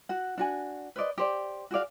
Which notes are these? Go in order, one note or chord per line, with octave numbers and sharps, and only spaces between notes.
F#4 F#5
D4 F#4 G#5
B4 C5 D5 D#5
G4 C5 D5
F#4 G#4 D5 F5